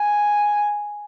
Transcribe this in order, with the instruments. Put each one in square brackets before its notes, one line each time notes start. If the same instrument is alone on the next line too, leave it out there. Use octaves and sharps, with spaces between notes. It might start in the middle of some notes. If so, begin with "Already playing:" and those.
Already playing: [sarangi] G#5